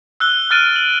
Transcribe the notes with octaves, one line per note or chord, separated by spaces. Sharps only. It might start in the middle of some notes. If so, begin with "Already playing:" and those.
E6 F#6 G7
F6 F#6 A6 D7 D#7
F#7